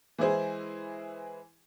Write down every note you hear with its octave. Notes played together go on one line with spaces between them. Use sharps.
E3 G#3 E4 G#4 C5